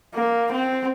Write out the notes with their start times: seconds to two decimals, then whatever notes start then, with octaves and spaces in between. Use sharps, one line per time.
0.14 A#3
0.51 C4